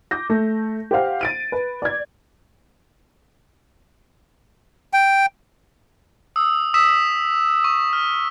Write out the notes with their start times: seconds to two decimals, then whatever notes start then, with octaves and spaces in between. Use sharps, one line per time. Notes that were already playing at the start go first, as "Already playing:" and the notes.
0.11 D6 G6 A#6
0.30 A3
0.91 G4 C5 F5 F#5
1.21 A6 D7 D#7
1.52 B4
1.82 D5 G#6
4.93 G5
6.36 D#6 E6
6.74 D#6 E6 B6 E7
7.64 C#6
7.93 F6